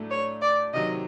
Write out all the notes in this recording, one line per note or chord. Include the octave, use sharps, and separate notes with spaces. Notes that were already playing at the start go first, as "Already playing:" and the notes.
Already playing: A2 F#3 A3 D4
C#5
D5
C3 D#3 F#3 D#5